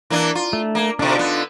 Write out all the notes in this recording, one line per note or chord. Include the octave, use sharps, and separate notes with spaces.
E3 A#3 D4
F4
A3
A#3
B2 D3 D4 D#4 F4
D3 B3